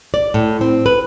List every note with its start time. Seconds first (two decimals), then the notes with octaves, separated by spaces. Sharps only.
0.14 D5
0.34 A2
0.61 C4
0.86 B4